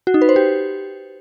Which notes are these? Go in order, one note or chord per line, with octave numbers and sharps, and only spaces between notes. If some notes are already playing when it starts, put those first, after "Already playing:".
F#4
D#4
B4
C5
G4